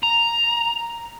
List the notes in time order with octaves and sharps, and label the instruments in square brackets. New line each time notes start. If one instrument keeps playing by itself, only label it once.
[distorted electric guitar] A#5